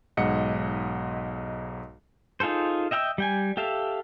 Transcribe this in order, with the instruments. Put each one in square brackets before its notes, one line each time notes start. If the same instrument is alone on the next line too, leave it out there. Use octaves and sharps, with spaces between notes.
[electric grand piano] B1 G#2 D#5 F#5 C#7
[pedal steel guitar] D#4 F4 G#4 A4 C5
D#5 E5 G5 A#5 E6
G3 G5 G#5
G4 A4 E5 F5